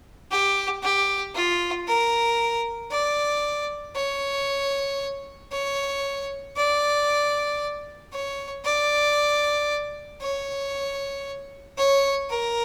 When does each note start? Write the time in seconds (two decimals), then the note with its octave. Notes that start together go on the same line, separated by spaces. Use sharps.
0.31 G4
0.83 G4
1.35 F4
1.88 A#4
2.91 D5
3.96 C#5
5.52 C#5
6.56 D5
8.13 C#5
8.65 D5
10.21 C#5
11.78 C#5
12.30 A#4